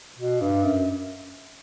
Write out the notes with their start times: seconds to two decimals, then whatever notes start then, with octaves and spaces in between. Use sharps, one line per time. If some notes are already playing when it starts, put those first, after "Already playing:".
0.18 B2
0.41 G2
0.64 F#2